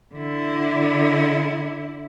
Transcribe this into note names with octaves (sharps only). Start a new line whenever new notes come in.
D3 E4